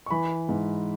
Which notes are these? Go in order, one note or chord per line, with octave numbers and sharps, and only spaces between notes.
C#6
E3 B5
G#2